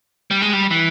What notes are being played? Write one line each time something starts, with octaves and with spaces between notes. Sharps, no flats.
G3
G#3
G3
E3